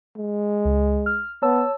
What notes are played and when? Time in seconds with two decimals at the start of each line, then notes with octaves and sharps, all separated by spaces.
0.17 G#3
0.65 C#2
1.06 F6
1.42 B3 C#5 A5 E6